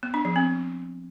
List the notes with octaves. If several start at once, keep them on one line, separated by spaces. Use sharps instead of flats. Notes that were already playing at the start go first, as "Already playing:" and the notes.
B3
D4
F3
C4